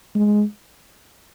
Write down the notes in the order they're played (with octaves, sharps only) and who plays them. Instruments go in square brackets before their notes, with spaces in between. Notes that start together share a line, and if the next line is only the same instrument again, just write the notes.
[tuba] G#3